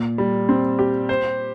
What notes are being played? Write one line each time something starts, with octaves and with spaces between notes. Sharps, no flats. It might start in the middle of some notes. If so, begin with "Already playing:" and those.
Already playing: A#2
G3
C4
G4
C5